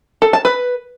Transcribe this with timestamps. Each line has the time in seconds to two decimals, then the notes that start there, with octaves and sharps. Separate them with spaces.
0.22 A4
0.33 A5
0.45 B4